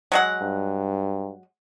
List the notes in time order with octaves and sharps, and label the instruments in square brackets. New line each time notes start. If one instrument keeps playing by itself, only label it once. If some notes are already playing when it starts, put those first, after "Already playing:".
[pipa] F#3 G#3 F#5
[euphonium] G2